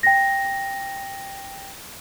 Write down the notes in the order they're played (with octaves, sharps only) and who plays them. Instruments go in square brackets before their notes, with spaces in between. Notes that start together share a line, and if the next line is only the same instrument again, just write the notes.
[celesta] G5 A#6